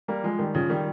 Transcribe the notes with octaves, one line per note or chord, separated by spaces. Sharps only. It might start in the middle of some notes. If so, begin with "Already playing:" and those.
G3 A#3
F3 G#3
D#3 G3
C#3 F3
D#3 G3